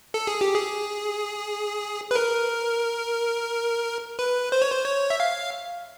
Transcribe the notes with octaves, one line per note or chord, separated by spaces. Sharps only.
A4
G#4
G4
G#4
B4
A#4
B4
C5
C#5
C5
C#5
E5
F5